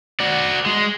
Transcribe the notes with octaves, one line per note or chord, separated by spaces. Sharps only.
F#4 D5
G#3